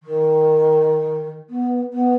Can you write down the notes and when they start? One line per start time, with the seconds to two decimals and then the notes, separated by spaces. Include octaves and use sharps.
0.03 D#3
1.50 B3
1.93 B3